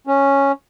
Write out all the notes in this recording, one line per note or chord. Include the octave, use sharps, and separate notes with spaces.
C#4